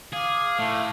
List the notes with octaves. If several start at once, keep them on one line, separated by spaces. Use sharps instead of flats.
G#4 F5 D6
A2 A3 E4 C5